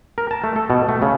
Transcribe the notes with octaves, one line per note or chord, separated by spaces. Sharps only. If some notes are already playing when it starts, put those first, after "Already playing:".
A#4
A5
A3
A4
B2
A3
C#3